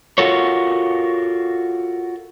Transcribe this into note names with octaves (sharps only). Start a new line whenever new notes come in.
F4 F#4 A4 A#4 C#5